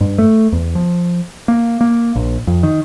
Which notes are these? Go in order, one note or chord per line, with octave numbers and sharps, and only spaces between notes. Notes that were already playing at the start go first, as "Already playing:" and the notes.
G2
A3
E2
F3
A#3
A#3
A#1
F2
D#3